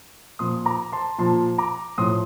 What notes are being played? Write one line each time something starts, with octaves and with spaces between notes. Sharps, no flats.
A#2 F3 C6 D#6
A#5 D6
A5 C6
A#2 F3 A5 C6
A#5 D6
A2 F3 C6 D#6